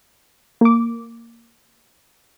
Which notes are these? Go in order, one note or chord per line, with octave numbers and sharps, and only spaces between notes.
A#3 D6